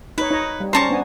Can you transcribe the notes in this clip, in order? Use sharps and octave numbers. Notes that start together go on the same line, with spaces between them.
D#4 B4 C#5
D#4 C#5 D#5
G3
C#4 C5 D5 A5 A#5 C#6
B3 D4 G#5